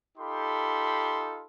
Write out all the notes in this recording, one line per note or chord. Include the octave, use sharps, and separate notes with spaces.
D#4 F4 G4 A4 B5 C6